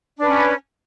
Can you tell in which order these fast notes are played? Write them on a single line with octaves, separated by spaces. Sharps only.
D4 B4 C#4